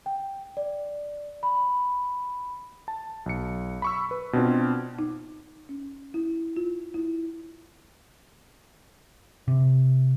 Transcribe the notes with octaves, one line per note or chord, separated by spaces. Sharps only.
G5
D5
B5
A5
B1 C#7
B5 C#6 E6
B4
B2 C4 D4 F4
D#4
C#4
E4
F4
E4
C3